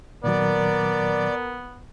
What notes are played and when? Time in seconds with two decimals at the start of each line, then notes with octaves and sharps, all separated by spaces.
0.24 A#2 D#3 F#3 B3 A#4 D5